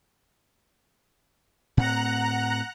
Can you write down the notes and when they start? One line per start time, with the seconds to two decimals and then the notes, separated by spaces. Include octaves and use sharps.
1.77 A2 C4 F#5 A#5 F#6